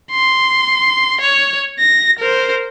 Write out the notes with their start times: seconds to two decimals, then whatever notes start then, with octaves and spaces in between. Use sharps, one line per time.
0.11 C6
1.21 C#5
1.79 A#6
2.19 A#4 C5